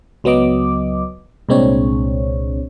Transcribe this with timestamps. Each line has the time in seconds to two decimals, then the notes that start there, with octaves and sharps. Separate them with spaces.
0.24 C#2 F#3 B3 D#5 D6
1.49 C2 A#2 G#3 C4 D4 C#5